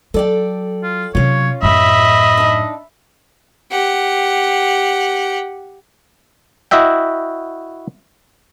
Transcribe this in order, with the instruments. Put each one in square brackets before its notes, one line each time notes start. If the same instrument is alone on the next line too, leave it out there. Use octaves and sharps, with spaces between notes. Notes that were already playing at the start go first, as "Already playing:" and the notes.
[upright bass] F#3 [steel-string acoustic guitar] A4 D5 G5
[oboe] F4
[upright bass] C3 F#3 [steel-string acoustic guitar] C#4 F4 [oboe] C#5
[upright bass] F#2 A2 [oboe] D#5 [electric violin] E5 B5
[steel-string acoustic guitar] D4 D#4
[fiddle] G4 F#5
[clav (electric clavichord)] E4 F#4 D#5 E5 G5